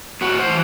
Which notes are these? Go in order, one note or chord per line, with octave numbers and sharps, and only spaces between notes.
A2 F#4
C5
E3